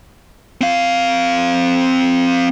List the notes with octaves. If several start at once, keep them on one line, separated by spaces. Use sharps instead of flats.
C4 F5